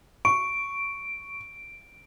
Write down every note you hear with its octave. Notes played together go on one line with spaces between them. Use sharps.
C#6 D7